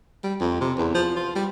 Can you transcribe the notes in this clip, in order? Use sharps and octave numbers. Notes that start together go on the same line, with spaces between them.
G3
F2
C3
E2
F3
F4
G3